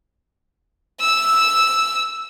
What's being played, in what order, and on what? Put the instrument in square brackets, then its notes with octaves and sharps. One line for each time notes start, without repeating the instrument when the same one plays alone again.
[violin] E6